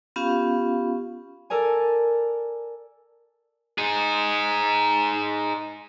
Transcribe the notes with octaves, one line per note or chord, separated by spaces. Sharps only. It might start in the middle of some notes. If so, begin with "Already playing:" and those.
B3 C#4 F4 G4 F5
A4 A#4 D5 G#5
D#4 G#4